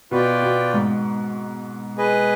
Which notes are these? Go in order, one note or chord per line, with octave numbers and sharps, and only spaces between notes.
B2 F4 B4 D5 G5
B2
G#2
G#4 B4 D#5